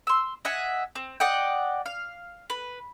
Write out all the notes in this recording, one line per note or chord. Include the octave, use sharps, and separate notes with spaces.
C6 E6
D#5 E5 F#5 G#5
C4
D5 D#5 F#5 G5
F5
B4